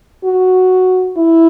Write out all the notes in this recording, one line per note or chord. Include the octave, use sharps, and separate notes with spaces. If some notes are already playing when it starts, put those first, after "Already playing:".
F#4
E4